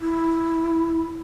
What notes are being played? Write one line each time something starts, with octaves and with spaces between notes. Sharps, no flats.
E4